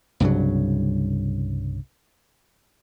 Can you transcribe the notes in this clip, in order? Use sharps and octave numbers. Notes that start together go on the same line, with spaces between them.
C2 G2 C#3 F#3